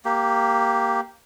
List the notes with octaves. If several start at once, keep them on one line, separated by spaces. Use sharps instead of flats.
A#3 G4